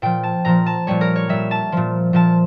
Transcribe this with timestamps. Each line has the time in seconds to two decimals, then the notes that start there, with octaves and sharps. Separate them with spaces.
0.02 A#2 F3 G5
0.23 A5
0.45 A#2 F3 A#5
0.66 A5
0.87 A#2 G3 C#5
1.01 A#4
1.16 C#5
1.29 A#2 G3 E5
1.51 A5
1.72 A#2 F3
2.13 A#2 F3 A5